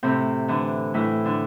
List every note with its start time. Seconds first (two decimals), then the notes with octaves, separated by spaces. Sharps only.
0.03 A2 C3 C4
0.48 D3 E3 D4
0.94 A2 E3 E4
1.25 D3 D4